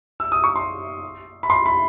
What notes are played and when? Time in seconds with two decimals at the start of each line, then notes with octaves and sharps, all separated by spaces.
0.20 E6
0.32 D#6
0.44 C#6
0.56 C6
1.43 B5
1.50 C6
1.66 B5